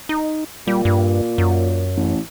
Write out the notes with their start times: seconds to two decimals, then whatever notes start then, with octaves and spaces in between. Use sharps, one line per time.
0.09 D#4
0.67 A#2 G3
0.85 G2
1.38 F#2
1.97 A1